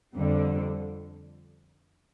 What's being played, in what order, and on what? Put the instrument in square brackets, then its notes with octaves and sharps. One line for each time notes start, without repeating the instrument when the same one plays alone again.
[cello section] F2 D3 G3